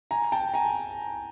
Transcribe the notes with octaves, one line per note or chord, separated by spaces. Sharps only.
G#5 A#5
G5 A5
G#5 A#5